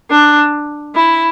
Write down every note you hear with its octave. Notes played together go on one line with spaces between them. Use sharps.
D4
E4